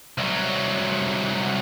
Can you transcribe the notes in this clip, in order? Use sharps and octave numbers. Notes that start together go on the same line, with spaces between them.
C2 F#3